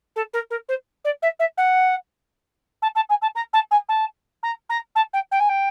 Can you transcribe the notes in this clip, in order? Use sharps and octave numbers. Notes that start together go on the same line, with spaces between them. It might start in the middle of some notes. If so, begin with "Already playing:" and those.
A4
A#4
A#4
C5
D5
E5
E5
F#5
A5
A5
G#5
A5
A#5
A5
G#5
A5
A#5
A#5
A5
G5
G5
G#5
G5